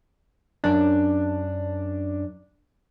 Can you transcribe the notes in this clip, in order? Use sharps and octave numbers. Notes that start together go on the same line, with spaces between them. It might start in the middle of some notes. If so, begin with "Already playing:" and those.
F#2 D4